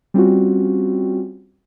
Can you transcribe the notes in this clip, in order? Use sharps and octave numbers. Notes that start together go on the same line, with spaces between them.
G3 C4 C#4 F4 F#4